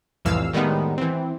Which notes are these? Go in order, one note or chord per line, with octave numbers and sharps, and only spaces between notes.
C2 F2 A2 E3 F5 E6
A2 D#3 G3 G#3 B3 D#4
E3 C4